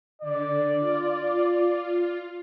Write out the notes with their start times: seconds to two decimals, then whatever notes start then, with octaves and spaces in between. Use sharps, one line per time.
0.22 D3 D5
0.79 F4